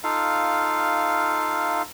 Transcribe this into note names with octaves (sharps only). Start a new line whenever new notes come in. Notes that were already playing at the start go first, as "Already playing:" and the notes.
D#4 F4 A4 F5